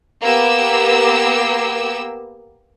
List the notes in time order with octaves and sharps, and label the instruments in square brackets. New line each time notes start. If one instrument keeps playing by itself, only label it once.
[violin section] A#3 B3 G4 E6